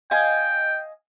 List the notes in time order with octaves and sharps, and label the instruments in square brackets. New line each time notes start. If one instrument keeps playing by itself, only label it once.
[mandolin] D#5 F5 G#5 [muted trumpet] G5